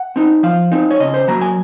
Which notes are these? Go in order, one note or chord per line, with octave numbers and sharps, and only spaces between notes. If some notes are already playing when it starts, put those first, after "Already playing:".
Already playing: F#5
C4 D#4
F3 F5
C4 D#4
C#5
C#3 D#5
C5
F#3 A#3 A#5
G#5